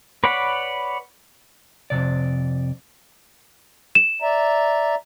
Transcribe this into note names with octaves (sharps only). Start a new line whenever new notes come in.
B4 C#5 D5 F#5 B5
F2 G#2 C3 D5
E7
D5 E5 A#5